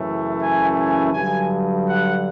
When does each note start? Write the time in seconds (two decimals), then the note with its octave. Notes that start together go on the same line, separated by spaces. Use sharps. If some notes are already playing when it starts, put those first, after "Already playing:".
Already playing: F#2 C#3 E3 A3
0.41 G#5
0.77 G#5
1.13 G2 D3 F#3 G#5
1.87 F#5